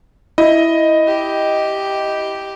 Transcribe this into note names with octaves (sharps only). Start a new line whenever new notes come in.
E4 D#5
G4